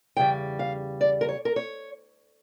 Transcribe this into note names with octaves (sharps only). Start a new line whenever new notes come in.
E2 C#3 G3 G5
F5
D5
A#4
C#5
A#4
C#5